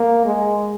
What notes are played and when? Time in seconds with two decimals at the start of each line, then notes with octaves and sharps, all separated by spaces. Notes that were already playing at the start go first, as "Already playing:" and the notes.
Already playing: A#3
0.26 G#3